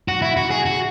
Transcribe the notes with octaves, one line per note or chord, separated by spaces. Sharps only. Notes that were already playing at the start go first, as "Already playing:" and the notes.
F#4
E4
F#4
G#4
F#4